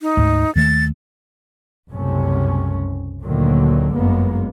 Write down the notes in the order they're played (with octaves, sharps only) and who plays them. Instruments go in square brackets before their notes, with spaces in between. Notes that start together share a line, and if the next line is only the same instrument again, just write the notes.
[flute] D#4
[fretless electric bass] D2 G#2
[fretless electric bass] D#2 D#3 A3 [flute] A6
[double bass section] F#1 C2 F#2 C3 A3 C#4
D2 A#2 D3 D#3 F#3 A#3
G1 F#2 G#3 A#3 B3